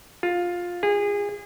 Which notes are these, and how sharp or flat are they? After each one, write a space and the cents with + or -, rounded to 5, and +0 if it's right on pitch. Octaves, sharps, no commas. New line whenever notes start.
F4 +10
G#4 -25